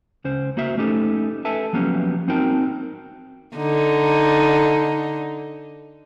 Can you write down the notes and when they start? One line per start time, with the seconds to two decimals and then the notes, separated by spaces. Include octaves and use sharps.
0.24 C#2 C#4 C5
0.57 A#3 F#4 C5 E5
0.77 A3 C#4 D#4 G4 A4
1.45 A4 B4 E5 G#5 A5
1.73 F3 F#3 A#3 B3 C#4 G4
2.28 C4 D#4 F#4 A#4 G5 A5
3.56 D3 D#4